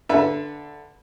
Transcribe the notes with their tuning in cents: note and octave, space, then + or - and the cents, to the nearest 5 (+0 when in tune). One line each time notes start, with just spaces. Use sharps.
D3 +0 B4 -15 E5 +15